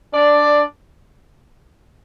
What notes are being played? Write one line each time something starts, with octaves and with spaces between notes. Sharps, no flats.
D4 D5